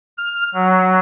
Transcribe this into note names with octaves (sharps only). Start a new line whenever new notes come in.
F6
F#3